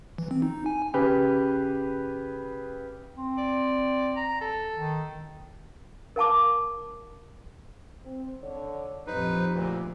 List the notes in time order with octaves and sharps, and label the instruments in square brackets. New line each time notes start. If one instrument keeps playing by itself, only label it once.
[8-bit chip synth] E3
C4
D#4
G#5
[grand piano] C#3 G4 B4
[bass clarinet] C4
[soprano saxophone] D5
A#5
A4
[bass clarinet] D#3
[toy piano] A#4 F5 A5 D6
[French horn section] C4
D3 C#5
[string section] A#1 F2 [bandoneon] D#4 B4 [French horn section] G4 C5
[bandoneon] D2 A#2